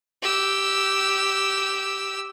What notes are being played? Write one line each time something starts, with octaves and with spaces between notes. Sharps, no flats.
G4 E6